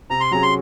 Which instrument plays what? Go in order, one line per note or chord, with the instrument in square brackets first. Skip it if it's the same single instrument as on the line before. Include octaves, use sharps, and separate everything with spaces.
[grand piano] C3 [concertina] A#5
[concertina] C6
[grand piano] F#3 C#4 G#4 [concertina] A#5
[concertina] C6